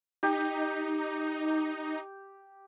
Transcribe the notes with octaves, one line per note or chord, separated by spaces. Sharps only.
D#4 G4